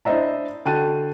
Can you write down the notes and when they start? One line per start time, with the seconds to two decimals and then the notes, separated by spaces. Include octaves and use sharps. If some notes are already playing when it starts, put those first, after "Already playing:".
0.05 D4 E4 C5 D#5 E5 A#5
0.65 D3 F#4 G5 A5 F#6 D#7